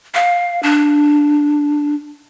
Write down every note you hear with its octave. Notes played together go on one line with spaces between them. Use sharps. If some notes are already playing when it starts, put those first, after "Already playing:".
F5
D4